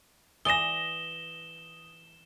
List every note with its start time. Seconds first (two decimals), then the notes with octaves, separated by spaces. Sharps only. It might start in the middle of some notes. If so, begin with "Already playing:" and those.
0.45 E3 D5 D#6 A#6 E7 G7